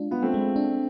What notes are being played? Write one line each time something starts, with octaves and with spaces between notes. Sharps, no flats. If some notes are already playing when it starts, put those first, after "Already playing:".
Already playing: G#3 D4 F4
B3 F4
A3 C4
G#3
D4